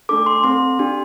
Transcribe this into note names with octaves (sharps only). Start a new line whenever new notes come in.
A3 D4 A4 D6
C6
C4 A4 C6
D4 G4